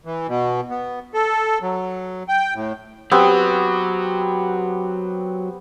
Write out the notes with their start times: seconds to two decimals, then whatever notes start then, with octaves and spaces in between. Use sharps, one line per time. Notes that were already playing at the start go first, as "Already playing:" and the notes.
0.05 E3
0.28 B2
0.70 B3
1.14 A4
1.62 F#3
2.29 G5
2.55 A2
3.11 F#3 B3 C4 G4